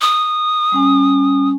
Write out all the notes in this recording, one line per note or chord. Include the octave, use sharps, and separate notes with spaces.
D#6
G3 C#4 G#5